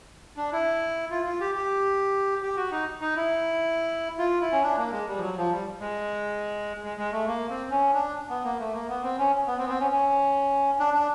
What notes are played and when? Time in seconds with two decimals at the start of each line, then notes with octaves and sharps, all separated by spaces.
0.37 D4
0.52 E4
1.11 F4
1.25 F4
1.41 G4
1.55 G4
2.43 G4
2.57 F#4
2.72 D#4
3.01 D#4
3.16 E4
4.19 F4
4.41 E4
4.52 C#4
4.63 D4
4.78 A#3
4.92 G#3
5.07 G3
5.17 F3
5.21 F#3
5.37 F3
5.51 G3
5.80 G#3
6.83 G#3
6.98 G#3
7.12 A3
7.27 A#3
7.50 C4
7.71 C#4
7.93 D4
8.30 B3
8.44 A#3
8.59 A3
8.74 A#3
8.89 B3
9.03 C4
9.18 C#4
9.47 B3
9.59 C4
9.66 B3
9.69 C4
9.80 C#4
9.91 C#4
10.80 D4
10.94 D4